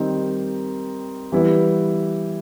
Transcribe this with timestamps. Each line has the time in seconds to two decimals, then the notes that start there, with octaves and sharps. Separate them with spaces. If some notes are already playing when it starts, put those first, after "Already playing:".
Already playing: D#3 G3 C4 D#4
1.32 E3 G3 B3 E4